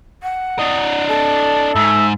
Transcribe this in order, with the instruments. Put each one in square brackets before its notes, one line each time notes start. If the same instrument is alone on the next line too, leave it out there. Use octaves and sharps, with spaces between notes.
[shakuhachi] F#5
[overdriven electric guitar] D4 D#5
[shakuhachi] A4
[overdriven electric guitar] G#2 [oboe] E5